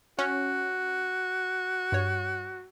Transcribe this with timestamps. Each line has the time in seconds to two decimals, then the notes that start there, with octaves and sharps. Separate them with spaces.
0.19 C#4 F#4
1.92 G2 C#5